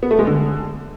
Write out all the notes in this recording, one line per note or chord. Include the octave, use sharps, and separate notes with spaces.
B3
A3
G#3
D3